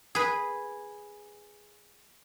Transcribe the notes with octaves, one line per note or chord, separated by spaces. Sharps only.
G#4 B4